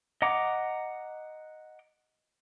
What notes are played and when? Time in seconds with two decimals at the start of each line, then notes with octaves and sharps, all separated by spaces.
0.22 D#5 F#5 A#5 D6